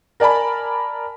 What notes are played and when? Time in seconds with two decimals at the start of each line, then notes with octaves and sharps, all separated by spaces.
0.20 A#4 D5 G#5 A5 B5